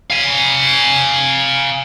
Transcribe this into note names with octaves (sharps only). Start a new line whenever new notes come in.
F5 G#5